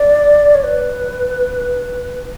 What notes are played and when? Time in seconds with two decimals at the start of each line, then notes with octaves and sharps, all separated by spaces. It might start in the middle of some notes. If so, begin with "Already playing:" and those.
Already playing: D5
0.54 C#5
0.64 B4